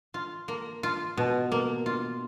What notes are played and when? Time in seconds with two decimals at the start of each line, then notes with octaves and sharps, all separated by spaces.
0.14 F4
0.48 A#3
0.83 F4
1.17 B2
1.52 A#3
1.86 F4